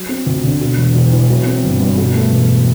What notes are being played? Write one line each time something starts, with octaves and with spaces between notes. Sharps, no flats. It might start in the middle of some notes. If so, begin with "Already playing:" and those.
Already playing: F#3
C4
D2
D3
B2
E1
E1
E2
F#3
C4
G1
G2
B2
A3
E1